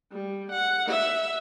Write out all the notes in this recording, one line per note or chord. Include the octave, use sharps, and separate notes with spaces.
G3
F#5
E5